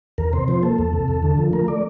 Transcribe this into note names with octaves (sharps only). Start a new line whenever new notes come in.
E2 A#4
C3 C5
F3 C5
A#3 A4
E2
C3
E2
D3
F3
A3 A#4
D5